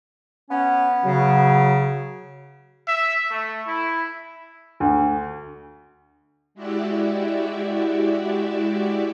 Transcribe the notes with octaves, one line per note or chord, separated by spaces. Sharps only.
B3 C#4
C#3 F#3
E5
A3
E4
D2
G#3 E4 F#4 G4 D5 E5